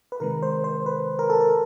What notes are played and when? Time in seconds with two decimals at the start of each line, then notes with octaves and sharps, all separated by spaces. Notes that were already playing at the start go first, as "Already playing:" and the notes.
0.12 B4
0.20 C3 D#3 G#3 A#4
0.43 C5
0.64 C5
0.86 B4
1.19 A#4
1.30 A4
1.41 A#4